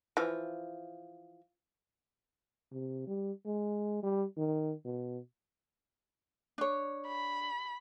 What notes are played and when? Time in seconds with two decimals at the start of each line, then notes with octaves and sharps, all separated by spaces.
0.17 E3 F3
2.72 C3
3.07 G3
3.46 G#3
4.03 G3
4.37 D#3
4.85 B2
6.58 D4 C#5
7.08 B5